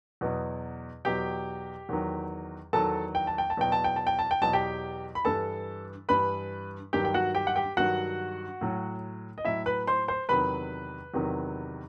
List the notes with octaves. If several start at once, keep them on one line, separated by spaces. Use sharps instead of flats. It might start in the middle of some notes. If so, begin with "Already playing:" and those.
E2 B2 F#3
E2 B2 F#3 G4 G5
E2 D#3 F#3
E2 D#3 F#3 A4 A5
G5
A5
G5
A5
E2 B2 F#3 G5
A5
G5
A5
G5
A5
G5
E2 B2 F#3 A5
G4 G5
B5
G2 E3 A4 A5
G2 E3 B4 B5
G2 D#3 F#3 G4 G5
G5
F#4 F#5
G4 G5
F#5
G4 G5
G2 D#3 F#3 F#4 F#5
A2 F#3
D#5
A2 F#3 E4 E5
B4 B5
C5 C6
C5 C6
E2 C3 D#3 F#3 B4 B5
E2 C3 D#3 F#3